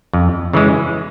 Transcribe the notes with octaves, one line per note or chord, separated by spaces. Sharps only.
F2
C#3 E3 G#3